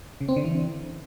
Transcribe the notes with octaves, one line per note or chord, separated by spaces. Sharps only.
C#3
C4
D3
E3